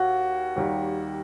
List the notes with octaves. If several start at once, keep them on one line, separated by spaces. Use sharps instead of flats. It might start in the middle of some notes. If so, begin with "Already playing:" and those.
Already playing: D#2 F#4
D#2 D#3 G3